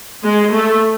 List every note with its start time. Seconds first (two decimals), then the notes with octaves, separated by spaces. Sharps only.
0.24 G#3
0.52 A3